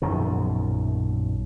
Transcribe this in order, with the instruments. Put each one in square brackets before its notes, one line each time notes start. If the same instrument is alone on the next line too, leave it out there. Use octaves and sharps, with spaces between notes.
[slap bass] A#1 F#2 B2 D#3